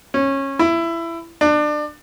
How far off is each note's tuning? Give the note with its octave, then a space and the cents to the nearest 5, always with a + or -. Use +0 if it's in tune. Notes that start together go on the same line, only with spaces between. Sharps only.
C#4 -20
E4 +20
D4 +25